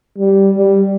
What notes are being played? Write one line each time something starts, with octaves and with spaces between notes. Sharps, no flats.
G3
G3